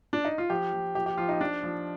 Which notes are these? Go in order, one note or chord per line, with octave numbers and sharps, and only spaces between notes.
D4
D#4
F4
F3 G4
F3
F3 G4
G4
F3 F4
D#4
F3 D4
F3